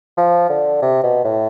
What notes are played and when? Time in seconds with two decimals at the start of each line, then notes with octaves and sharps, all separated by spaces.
0.17 F3
0.49 D3
0.82 C3
1.04 B2
1.25 A2